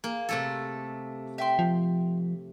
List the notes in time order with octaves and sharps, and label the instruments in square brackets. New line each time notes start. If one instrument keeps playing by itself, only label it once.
[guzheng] A#3 [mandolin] G#4
[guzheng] C3 A3 A4
[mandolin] E5 G5 C6
[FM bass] F3